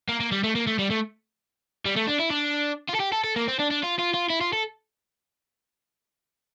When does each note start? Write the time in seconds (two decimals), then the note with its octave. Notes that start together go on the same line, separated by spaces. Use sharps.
0.09 A#3
0.20 A#3
0.32 G3
0.44 A3
0.55 A#3
0.67 A3
0.79 G3
0.90 A3
1.85 G3
1.96 A3
2.07 D4
2.19 E4
2.30 D4
2.89 F4
2.95 A4
3.00 G4
3.12 A4
3.24 A4
3.36 A#3
3.48 C4
3.59 D4
3.71 D4
3.83 F4
3.99 F4
4.14 F4
4.30 E4
4.41 F4
4.53 A4